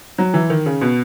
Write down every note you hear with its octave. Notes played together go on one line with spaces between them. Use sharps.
F#3
E3
D#3
C#3
B2